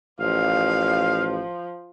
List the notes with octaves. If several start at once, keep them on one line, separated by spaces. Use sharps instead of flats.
A1 F3 F5